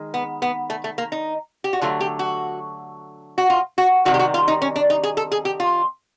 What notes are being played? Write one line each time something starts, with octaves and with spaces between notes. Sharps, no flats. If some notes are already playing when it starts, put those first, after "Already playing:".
Already playing: D#3 G#3
B3
B3
A3
A3
A#3
D#4
G4
F#4
D3 F#3 A3 F4
G4
F#4
F#4
F4
F#4
C3 D#3 G3 F#4
G4
F#4
F4
D#4
C#4
D4
D#4
G#4
A4
G#4
G4
F4